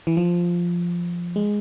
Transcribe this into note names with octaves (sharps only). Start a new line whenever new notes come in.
E3
F3
G#3